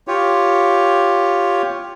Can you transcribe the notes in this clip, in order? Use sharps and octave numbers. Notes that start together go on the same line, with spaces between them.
F4 G4 C#5